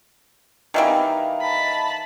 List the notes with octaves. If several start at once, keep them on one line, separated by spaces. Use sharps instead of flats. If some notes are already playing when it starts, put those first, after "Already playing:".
D#3 E3 G3 D#5 F5 A#5
A5 B5